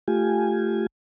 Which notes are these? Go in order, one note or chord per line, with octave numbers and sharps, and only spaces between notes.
A3 F4 G4 G#5